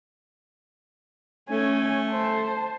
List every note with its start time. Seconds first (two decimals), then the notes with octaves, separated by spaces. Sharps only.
1.49 A3 C#4 G#5
2.09 C5 A5